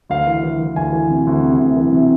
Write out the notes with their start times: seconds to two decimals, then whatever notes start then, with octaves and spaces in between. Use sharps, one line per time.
0.10 D2 F5
0.27 E3
0.44 E3
0.60 E3
0.76 D2 G#5
0.93 E3
1.10 C3
1.27 D2
1.43 C3
1.59 D2
1.76 E3
1.92 C3